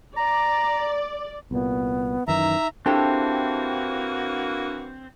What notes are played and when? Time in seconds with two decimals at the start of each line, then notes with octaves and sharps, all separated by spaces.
0.17 D5 A#5
1.51 C2 A#2 B3
2.28 F#2 D#3 E3 D#4 E5 A#5
2.86 E3 A#3 C4 D4 E4 F#4 G4 A4